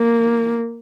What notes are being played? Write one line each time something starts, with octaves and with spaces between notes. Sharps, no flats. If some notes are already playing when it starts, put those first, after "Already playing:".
Already playing: A#3